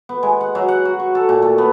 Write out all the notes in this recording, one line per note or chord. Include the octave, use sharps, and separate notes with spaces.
B3
G#3
F#5
F#3
F#5
F#4
C#6
A4
A#2
A3
B3